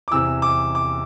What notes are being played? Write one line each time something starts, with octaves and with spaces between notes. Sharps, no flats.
D6
E2 C3 E3 E6
D6
D6